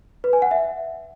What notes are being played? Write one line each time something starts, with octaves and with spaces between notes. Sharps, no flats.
B4
G#5
F#5
E5